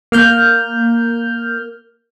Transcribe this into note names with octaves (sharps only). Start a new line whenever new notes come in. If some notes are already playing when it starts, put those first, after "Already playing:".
A#3 F6 G6